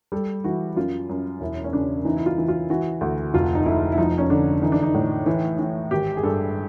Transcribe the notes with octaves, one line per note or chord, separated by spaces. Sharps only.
G3 A4
E3 F#4
F#2 F4
F#2
E1 E4
C#4
C#3 D4
E3 D#4
E4
F4
E3
F4
E3 F#4
D2
F1 F4
D#4
F1 E4
E4
F3 D#4
C#4
D3 D4
E3 D#4
D4
D#4
A2
E3
E3
G#1 G4
G#4
G2 A4